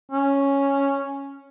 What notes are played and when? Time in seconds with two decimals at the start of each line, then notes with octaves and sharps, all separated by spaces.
0.12 C#4